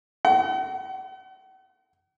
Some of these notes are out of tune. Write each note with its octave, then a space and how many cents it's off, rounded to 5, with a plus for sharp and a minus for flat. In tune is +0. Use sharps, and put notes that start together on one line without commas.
F#5 +45